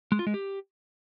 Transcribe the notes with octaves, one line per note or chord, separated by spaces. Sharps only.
G#3
F4
G#3
G4